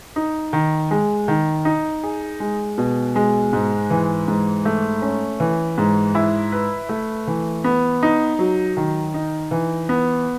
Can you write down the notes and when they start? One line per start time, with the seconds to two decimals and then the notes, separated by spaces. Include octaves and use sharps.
0.16 D#4
0.53 D#3
0.91 G#3
1.28 D#3
1.65 D#4
2.03 G#4
2.40 G#3
2.78 B2
3.16 G#3
3.53 G#2
3.90 E3
4.28 G#2
4.65 A3
5.02 C#4
5.40 E3
5.78 G#2
6.15 E4
6.52 B4
6.89 A3
7.27 E3
7.64 B3
8.03 D#4
8.39 F#3
8.77 D#3
9.14 D#4
9.51 E3
9.89 B3